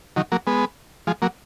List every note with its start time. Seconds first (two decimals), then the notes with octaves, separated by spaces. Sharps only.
0.16 D#3 F#3
0.32 F#3 A#3
0.47 G#3 B3
1.07 F3 G#3
1.22 F#3 A#3